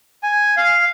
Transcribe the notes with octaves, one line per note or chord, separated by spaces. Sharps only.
G#5
F5